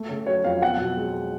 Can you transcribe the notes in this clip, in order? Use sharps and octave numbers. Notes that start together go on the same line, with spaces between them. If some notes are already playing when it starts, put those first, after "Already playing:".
Already playing: A3
C#3
F#3 C#5
F2 F5
B1 F#5
B2
G#3